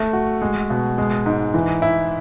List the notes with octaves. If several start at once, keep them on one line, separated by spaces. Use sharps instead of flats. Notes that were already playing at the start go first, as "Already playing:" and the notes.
Already playing: A3
F#4
G#3
B2
G#3
G#2
E3
E4